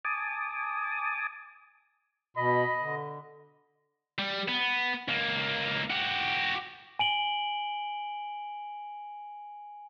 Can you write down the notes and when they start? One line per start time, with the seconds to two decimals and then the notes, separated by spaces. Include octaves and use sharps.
0.05 G#5 A5 D6 D#6
2.37 B2 D#5 B5
2.82 D3
4.19 G3
4.48 B3
5.08 C#2 A#3
5.90 F#4 G4
6.99 G#5 D7 F#7 G7